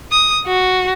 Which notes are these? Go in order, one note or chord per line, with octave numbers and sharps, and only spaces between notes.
D#6
F#4